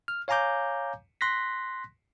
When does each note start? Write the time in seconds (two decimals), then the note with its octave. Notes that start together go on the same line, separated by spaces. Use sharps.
0.08 F6
0.28 C#5 F5 G#5 A#5 D6 G6
1.21 C6 F#6 A#6 B6